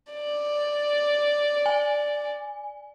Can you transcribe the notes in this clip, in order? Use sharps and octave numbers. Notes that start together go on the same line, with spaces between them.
D5
G#5